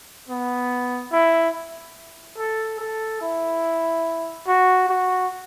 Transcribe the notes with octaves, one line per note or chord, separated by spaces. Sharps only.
B3
E4
A4
A4
E4
F#4
F#4